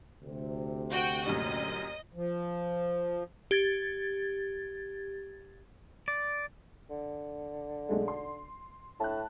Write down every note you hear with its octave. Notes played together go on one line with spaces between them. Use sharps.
D2 C3
F#4 G5
F#2 A#2 G3 D#5
F3
G4 G#6 A6
D5
D3
B1 G#3 A3
C6
A2 A5 F#6